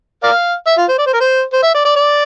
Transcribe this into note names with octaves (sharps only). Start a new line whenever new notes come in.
A#4 D5 F5
E5
F4
C5
D5
C5
A#4
C5
C5
E5
D5
D5
D5